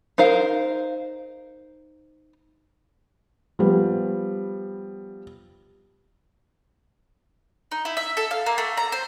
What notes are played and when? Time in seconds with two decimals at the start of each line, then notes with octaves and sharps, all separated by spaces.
0.18 D#4 A#4 C5 F5
3.59 F3 G3 B3
7.72 D#4
7.85 E4
7.97 E5
8.17 A4
8.31 F5
8.46 A#3
8.58 A3
8.77 A#5
8.92 C5